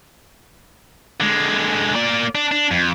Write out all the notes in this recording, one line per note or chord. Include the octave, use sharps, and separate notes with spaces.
D3 G#3
A#3 D5
D4
D4
F2